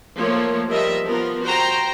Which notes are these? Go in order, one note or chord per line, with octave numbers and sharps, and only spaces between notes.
F3 A3 A#3 C#5
F3 G3 A#4 D#5 E5
F3 B3 A#4
F#4 C5 G5 A#5